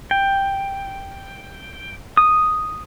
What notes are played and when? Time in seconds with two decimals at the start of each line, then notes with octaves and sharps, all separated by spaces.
0.11 G5
2.17 D#6